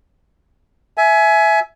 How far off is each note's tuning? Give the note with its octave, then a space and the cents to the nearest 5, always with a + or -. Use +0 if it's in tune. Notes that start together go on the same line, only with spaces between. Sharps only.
E5 +0 G#5 +25